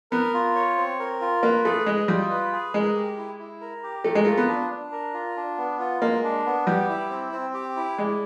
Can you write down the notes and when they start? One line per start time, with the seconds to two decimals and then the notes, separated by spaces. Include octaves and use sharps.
0.12 B3 A#4
0.34 F4
0.55 C#5
0.77 C4
1.00 A#4
1.21 F4
1.43 A#3 B4
1.65 A3 G#4
1.86 G#3 D#5
2.08 G3 F4
2.30 B4
2.52 G#4
2.74 G#3 A#4
2.95 G4
3.18 E4
3.39 E4
3.61 A#4
3.83 G4
4.04 A3 A#4
4.15 G#3
4.25 A3 F4
4.37 B3
4.48 D4
4.71 D4
4.92 A#4
5.14 F4
5.36 D4
5.57 B3
5.79 F4
6.01 G#3 A#3
6.23 D4
6.46 B3
6.67 G3 G4
6.89 E4
7.10 C4
7.32 C4
7.54 G4
7.76 E4
7.98 G#3 D5